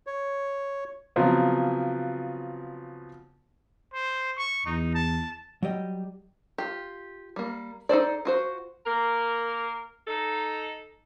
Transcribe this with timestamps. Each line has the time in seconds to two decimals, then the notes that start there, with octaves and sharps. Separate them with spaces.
0.07 C#5
1.16 C#3 F3 F#3 B3 C4
3.94 C5
4.37 C#6
4.66 E2 D#4
4.95 A5
5.63 F#3 G3 D#5 G5
6.58 F4 G4
7.36 G3 A#3
7.89 D#4 A4 C5 D5
8.25 F4 F#4 C5
8.86 A#3 A#4
10.07 D#4 A4